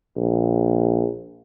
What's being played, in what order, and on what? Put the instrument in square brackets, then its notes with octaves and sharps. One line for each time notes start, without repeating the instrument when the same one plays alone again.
[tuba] A#1